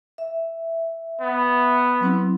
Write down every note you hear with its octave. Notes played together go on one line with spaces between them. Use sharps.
E5
B3
F#3 C4 E4